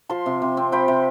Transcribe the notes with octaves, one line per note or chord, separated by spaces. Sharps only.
F3 A5 C6
C3
C3
C4
F3 G5 B5
C3